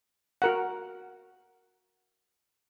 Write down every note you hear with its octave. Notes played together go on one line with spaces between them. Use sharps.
F#4 A#4 F#5